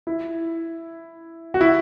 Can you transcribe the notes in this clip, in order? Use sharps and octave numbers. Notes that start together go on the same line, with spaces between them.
E4
F#4
E4